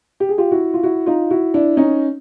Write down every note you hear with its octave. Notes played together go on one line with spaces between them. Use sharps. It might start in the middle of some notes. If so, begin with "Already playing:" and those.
G4
G#4
F4 G4
E4 F#4
F4
E4 F#4
D#4 F4
E4 F#4
D4 E4
C#4 D#4